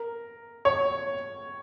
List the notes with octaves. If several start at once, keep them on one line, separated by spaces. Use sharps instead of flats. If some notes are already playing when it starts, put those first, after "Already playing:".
Already playing: A#4
C#5